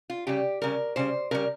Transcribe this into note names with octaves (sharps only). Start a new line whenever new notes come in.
F4
C#3 G3 G4
C#3 G3 A#4
C#3 G3 C5
C#3 G3 A#4